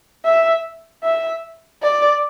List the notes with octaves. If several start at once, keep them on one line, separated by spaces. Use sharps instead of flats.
E5
E5
D5